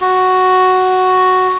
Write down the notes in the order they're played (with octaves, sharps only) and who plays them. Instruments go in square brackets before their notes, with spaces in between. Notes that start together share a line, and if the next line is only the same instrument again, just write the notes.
[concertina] F#4